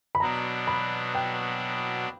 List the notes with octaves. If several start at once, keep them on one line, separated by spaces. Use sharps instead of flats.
B5
B2 F#3 B3 D4 A#5
B5
G5